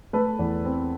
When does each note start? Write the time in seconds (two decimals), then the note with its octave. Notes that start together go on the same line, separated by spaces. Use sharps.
0.13 A3 A4 B4
0.39 E2
0.65 C4